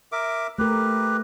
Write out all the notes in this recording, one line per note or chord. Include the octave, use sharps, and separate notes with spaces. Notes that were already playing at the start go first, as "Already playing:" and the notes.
A#4 E5 D6
A3 G4 A#4 B4